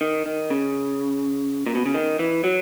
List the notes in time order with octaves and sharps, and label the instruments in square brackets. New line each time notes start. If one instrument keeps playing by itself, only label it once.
[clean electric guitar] D#3
D#3
C#3
A#2
B2
C#3
D#3
E3
F#3